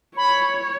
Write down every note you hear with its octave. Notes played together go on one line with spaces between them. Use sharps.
C#5 B5